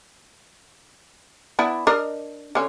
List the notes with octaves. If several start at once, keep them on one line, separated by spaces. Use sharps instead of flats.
B3 D4 E4
D4 A#4 D#5
D3 C#4